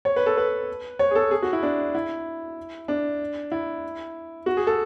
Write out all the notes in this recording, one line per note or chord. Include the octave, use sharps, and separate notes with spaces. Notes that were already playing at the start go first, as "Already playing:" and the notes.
C#5
B4
A4
B4
C#5
G#4
A4
G#4
F#4
E4
D4
E4
D4
E4
F#4
G#4
A4